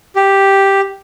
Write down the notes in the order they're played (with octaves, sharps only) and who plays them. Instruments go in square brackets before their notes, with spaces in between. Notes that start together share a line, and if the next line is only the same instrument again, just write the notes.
[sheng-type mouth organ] G4